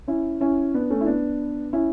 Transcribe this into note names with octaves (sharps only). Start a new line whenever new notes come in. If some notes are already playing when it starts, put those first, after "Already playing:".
C#4 E4
C#4 E4
B3 D4
A3 C#4
E4
B3 D4
C#4 E4